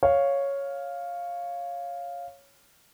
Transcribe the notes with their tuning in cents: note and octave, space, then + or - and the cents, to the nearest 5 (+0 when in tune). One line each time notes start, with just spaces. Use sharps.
C#5 +0 F5 +0